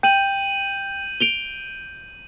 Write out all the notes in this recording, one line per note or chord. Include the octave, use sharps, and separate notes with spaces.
G5 G6 D#7 F#7
D7 F7 G7